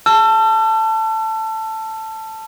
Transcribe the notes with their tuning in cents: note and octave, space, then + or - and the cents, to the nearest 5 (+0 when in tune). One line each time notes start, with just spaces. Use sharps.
A5 +5 E6 +40